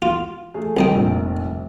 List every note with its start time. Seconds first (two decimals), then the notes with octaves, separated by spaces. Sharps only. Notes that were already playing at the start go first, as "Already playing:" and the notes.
0.02 F4
0.54 A3 G#4
0.77 C2 D#5 G5
0.93 F1 A#1 A#4